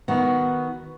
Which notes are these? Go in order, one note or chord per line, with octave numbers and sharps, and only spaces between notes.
D#3 B3 F#4